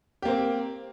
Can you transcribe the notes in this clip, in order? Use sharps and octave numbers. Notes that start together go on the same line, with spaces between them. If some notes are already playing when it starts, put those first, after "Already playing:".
A#3 C4 G4